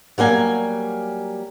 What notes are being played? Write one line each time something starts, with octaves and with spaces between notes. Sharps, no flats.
F#3 G3 A#3 G#5